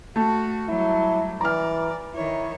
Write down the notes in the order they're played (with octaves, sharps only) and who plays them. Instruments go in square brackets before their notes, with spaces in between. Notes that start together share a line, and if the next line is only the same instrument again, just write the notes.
[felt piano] A3 [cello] F#4
[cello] F#3 G3 [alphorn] E4
[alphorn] E3 [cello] D5 [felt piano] A#5 F6
[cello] D#3 C#5 [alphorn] E4